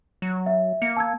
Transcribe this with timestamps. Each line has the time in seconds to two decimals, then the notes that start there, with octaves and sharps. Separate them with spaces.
0.22 F#3
0.46 E5
0.82 A#3 C#7
0.97 A5 E6 G#6